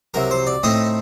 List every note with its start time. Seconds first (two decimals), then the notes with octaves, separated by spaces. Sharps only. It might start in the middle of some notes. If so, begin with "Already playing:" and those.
0.14 C2 C3 F#3 A#4
0.31 C5
0.47 D5
0.63 A2 A3 C4 D#4 D#5